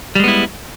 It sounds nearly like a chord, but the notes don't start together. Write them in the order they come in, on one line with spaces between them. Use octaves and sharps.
G3 G#3 B3 E4